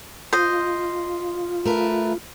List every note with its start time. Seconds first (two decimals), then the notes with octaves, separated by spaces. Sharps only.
0.33 F4 C5 D#5
1.66 A3 A#4 B4